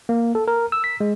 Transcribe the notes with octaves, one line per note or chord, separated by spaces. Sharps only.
A#3
A4
A#4
E6
B6
G#3